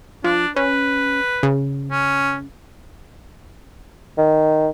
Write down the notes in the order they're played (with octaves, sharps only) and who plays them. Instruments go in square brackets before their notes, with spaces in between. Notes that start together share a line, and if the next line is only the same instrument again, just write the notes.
[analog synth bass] F3 [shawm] D4
[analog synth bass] C#4 [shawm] B4
[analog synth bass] C#3
[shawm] C#4
[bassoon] D#3